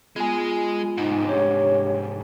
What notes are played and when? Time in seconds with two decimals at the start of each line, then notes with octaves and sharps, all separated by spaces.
0.16 G#3 B3 F4 G#4
0.98 C2 G#2 D#4
1.27 D4 G4 C#5